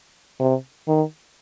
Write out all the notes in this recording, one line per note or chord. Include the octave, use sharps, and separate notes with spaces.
C3
D#3